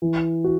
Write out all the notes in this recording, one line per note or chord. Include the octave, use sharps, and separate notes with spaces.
E3
F#4